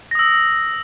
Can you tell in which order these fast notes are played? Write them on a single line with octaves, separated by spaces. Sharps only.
A#6 D#6 E6